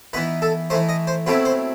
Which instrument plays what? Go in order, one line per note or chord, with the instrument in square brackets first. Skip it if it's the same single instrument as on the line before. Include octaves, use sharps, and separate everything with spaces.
[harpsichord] E3 B3 D#4 B4
A4
E3 A3 D#4 C5
D#5
C5
B2 F#3 A3 C4 E4 B4
C5